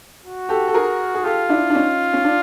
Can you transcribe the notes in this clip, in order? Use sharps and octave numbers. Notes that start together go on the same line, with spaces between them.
F#4
G4 A4
A4
G#4 A#4
G#4
F4 G4 A4
D4 E4
D4
C#4 D#4
C#4
D4